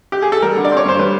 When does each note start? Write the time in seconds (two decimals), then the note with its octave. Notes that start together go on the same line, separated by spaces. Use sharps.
0.12 G4
0.22 G#4
0.32 A4
0.42 G3 A#4
0.57 D3
0.65 D5
0.72 C4
0.77 C#5
0.85 G2 C5
0.99 G3 B4